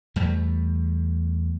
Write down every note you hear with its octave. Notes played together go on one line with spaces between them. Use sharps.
E2 G3 A3